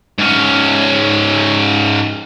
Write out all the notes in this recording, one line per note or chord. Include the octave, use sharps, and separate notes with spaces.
G#2 C#4